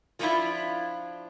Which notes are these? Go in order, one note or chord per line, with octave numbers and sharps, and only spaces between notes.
F3 G#3 A3 D4 E4 F4